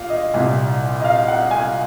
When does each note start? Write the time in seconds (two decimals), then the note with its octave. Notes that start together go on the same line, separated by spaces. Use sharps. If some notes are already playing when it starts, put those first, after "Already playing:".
Already playing: A#2 F5
0.09 D#5
0.34 C2 A#2
1.00 D#5
1.04 F5
1.28 F#5
1.51 G#5